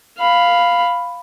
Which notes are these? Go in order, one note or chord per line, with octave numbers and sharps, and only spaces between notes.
F5 B5